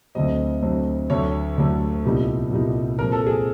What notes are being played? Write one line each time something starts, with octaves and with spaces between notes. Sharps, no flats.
D2 D3 F#3 A3 C4 D#5
D2 D3 F#3 A3 C4
D2 D3 F#3 A3 C#5
D2 D3 F#3 A3
C2 A#2 G3 B3 D#4
C2 A#2 G3 B3 D#4
A#2 F3 G#3 C4 A#4
A4
G#4